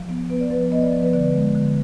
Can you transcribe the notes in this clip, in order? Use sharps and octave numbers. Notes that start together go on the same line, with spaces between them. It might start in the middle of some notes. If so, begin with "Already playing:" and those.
Already playing: F3
B3
B3 B4
D5
F3 B4
B3 D#5
D5
F3 D5
B4
D3 D5
G#3
D3